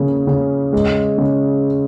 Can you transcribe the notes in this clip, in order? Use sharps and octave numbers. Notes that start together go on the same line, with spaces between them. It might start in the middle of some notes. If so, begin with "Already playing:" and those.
Already playing: C#3 A#3
C#3
G#3
C#3